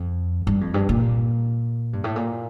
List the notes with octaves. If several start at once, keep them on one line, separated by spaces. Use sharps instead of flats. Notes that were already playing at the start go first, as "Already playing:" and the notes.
Already playing: F2
G2
F2
G2
A#2
G2
A2
A#2